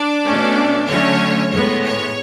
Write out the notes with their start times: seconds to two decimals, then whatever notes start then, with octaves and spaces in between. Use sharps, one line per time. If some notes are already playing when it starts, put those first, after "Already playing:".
Already playing: D4 D5
0.25 B2 A3 C#4
0.88 D3 F#3 A3 C#4 C#5
1.52 A2 G#3 B3 C#5
1.84 C#5